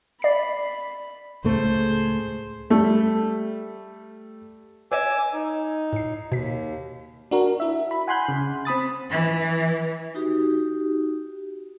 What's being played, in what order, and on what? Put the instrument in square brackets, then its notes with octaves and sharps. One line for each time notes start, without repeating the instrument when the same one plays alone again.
[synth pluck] D5 C7 [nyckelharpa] B5
[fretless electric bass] C#2 A2 A3 [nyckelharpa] G#4 C5
[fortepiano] G3 A3
[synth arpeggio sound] B4 C#5 D#5 [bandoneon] G#5 D6 E6
[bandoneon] D#4
[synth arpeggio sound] A2 C7
[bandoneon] D#2 [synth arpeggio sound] B2 B6
[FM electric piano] D4 F#4 A#4
E4 E5
B5
F#5 G#5 B5 C6 F#6 G6
C#3
C4 B5 D#6 A6
[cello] E3
[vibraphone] D#4 F#4 G4